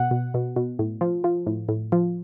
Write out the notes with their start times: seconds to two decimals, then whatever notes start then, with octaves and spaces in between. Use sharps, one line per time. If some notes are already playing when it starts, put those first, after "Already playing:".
Already playing: B2 F#5
0.11 B2
0.34 B2
0.56 B2
0.79 A2
1.01 F3
1.24 F3
1.47 A2
1.69 A2
1.92 F3